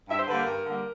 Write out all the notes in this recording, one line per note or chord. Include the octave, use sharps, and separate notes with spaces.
G2 E5
C5
D3 G3 A#3 B4
A#4
G2
D3 G3 A#3